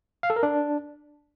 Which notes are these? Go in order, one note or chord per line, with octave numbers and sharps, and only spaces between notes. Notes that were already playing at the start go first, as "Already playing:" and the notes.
F5
A4
A#4
D4